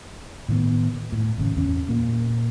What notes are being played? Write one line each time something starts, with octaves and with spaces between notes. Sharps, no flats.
A2 D#3 B3
A2
G#1 C#3
E2 C#4
A#2 A#3